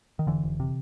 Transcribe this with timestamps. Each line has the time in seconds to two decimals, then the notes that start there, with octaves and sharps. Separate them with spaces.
0.19 D#3
0.27 F1 D3 E3
0.43 F1
0.60 C3